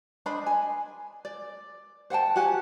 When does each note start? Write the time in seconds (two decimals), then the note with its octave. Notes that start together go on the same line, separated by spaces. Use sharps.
0.26 D4 C5 D#5 B5
0.46 G#5
1.25 D5
2.10 C5 F#5 G5 A5
2.36 F#4 G4 F#5 G#5